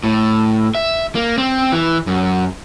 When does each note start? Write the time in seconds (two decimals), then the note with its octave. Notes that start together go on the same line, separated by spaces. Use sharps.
0.04 A2
0.75 E5
1.15 A#3
1.38 C4
1.72 E3
2.07 F#2